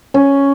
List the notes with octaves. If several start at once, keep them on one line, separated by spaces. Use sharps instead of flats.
C#4